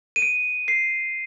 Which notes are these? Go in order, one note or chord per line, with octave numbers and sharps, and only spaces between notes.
D#7
D7
C7